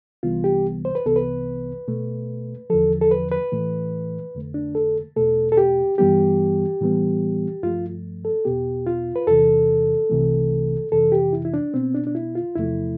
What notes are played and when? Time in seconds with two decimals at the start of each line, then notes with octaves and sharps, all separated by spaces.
0.23 C2 C3 E3 G3 B3 F4
0.44 G4
0.85 C5
0.95 B4
1.06 C2 C3 E3 B3 A4
1.16 B4
1.88 B2 A3
2.70 E2 D3 F3 A4
3.01 A4
3.11 B4
3.32 B4
3.52 A2 E3 A3
4.35 F2 D3 A3
4.54 D4
4.75 A4
5.16 E2 B2 A3 A4
5.52 A4
5.57 G4
5.98 G2 E3 G3 B3 G4
6.81 A2 E3 G3 B3
7.63 G2 F3 A3 F4
8.25 A4
8.45 E2 B2 B3 G4
8.86 F4
9.16 B4
9.27 E2 C3 E3 A4
10.10 C2 C3 E3 A3
10.91 F2 C3 E3 A4
11.12 G4
11.33 E4
11.45 E4
11.54 D4
11.74 B2 B3 C4
11.94 D4
12.07 D4
12.15 E4
12.35 F4
12.56 E2 C3 F3 A3 E4